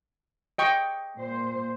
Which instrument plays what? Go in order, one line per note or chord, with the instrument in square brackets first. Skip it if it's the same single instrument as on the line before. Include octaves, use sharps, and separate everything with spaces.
[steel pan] D#5 G5 C#6
[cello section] A#2 C5